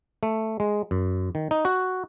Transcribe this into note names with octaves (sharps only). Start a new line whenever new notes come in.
A3
G#3
F#2
D#3
D#4
F#4